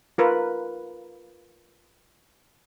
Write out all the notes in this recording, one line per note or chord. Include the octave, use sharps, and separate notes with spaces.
F4 A#4 B4